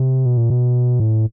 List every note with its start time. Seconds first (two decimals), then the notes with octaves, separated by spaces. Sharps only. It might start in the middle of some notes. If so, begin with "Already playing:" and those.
Already playing: C3
0.26 B2
0.37 A#2
0.50 B2
1.00 A2